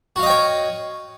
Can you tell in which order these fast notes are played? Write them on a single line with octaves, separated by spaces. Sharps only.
F#4 F5 D#5 G5 C#5